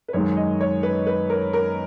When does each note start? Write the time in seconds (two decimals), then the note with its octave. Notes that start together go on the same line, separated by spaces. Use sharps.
0.08 B4
0.13 F#2 D#3 G#3 C#5
0.37 D#5
0.61 C#5
0.83 B4
1.07 B4
1.30 A#4
1.53 A#4